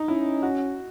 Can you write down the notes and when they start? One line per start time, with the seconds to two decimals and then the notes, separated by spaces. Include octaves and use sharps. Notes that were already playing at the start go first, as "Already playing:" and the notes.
Already playing: D#4
0.08 C#4 E4
0.42 F#4